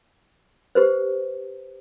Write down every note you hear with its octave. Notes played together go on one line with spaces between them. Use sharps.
G4 B4 C5